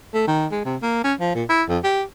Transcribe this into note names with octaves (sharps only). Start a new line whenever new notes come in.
A3
D#3
G#3
C3
A#3
C#4
F3
A#2
E4
F2
G4